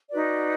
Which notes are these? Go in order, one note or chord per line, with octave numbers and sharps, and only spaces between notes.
D#4 F#4 B4 D5